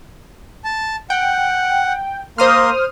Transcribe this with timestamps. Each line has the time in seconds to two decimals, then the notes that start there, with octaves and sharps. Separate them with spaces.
0.64 A5
1.10 F#5 G5
2.38 A#3 A#4 C5 C6 D#6 F6